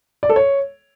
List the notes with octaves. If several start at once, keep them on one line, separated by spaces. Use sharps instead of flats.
D5
A4
C#5